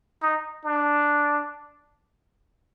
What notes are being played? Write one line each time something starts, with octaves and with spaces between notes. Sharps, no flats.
D#4
D4